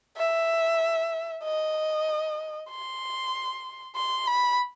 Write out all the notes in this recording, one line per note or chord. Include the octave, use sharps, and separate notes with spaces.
E5
D#5
C6
C6
B5